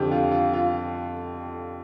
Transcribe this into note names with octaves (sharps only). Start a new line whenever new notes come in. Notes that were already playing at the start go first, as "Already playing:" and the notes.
Already playing: F2 D3 G4 G5
F4
F4
F4